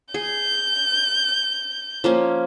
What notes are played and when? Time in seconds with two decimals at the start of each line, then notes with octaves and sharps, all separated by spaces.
0.14 G#4 G6
2.04 F3 A#3 C#4